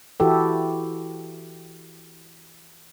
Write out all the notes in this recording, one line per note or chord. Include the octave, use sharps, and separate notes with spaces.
E3 E4 F#4 G4 A4